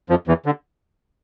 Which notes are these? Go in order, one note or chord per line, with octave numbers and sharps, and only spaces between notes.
F2 F3
E2 E3
D3